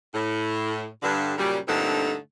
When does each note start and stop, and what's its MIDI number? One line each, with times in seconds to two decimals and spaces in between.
0.14 0.87 45
1.02 1.33 43
1.02 1.33 50
1.38 1.58 42
1.38 1.58 46
1.38 1.58 49
1.38 1.58 55
1.68 2.15 43
1.68 2.15 46
1.68 2.15 50
1.68 2.15 57
1.68 2.15 60
1.68 2.15 63